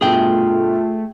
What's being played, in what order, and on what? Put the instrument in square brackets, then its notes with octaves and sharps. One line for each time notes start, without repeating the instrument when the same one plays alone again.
[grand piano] G2 B2 [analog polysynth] A3 [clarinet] F4 [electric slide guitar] G#4 G5